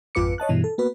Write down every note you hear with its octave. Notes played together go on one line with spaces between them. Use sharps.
G#1 F2 F4 B4 D6 C#7
C#5 D#5 A5 F#6
G2 B2 E3
A4
A#3 B3 F#4 B4